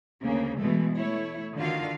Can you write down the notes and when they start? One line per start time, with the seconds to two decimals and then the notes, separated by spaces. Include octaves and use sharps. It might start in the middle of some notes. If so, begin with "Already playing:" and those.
0.22 D2 C#3 A#3
0.57 B2 E3 G#3 A3
0.96 A3 E4 C#5
1.55 D3 D#3 F4 F#4 F5